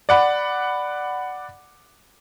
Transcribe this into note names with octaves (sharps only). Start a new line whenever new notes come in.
D5 F#5 B5